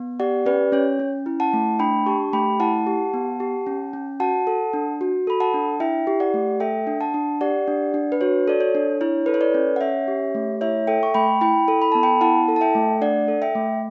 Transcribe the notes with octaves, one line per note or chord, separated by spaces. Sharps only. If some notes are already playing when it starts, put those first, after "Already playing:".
Already playing: B3
G4 D5 F#5
C#4 B4 D5
C#4 C#5
C#4
E4
F#5 A5
A3
D4 G5 B5
G4 A5 C#6
A3 G5 B5
E4 F#5 A5
G4
B3
G4
C#4
C#4
F#4 F#5 A5
A4
D4
F#4
A4 B5
F#5 A5
D4
E4 E5 G5
G4
D5 F#5
A3
A4 E5 G5
D4
F#5 A5
D4
G4 D5 F#5
D4
D4
B4
F#4 C#5
A4 D5
C#5
D4
E4 C#5
A4 B4
C#5
B4 D5
C#4
F#5
C#4 C#5 E5
G4
A3
E4 C#5 E5
A4 E5 G5
C#6
A3 G5 B5
E4 G5 B5
A4
B5
B3 A5
G5 B5
E4 F#5 A5
A4
A5
E5 G5
A3
D4 D5 F#5
A4
E5 G5
A3